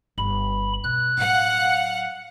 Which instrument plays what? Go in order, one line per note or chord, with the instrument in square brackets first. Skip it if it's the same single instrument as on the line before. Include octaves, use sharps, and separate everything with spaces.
[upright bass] G1 [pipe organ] B5
[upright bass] B2 [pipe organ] F#6
[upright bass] A2 F#3 [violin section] F5 F#5